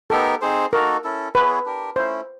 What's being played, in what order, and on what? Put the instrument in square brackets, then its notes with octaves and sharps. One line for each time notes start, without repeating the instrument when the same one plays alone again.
[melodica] B3 D#4 G4 A#4 [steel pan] A4
[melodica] C4 D#4 G#4 C5
[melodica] A#3 D#4 F#4 A4 [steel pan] A#4
[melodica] C#4 E4 A4
[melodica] B3 E4 G#4 C#5 [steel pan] B4
[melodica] D4 G4 A#4
[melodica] A3 C#4 E4 [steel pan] C5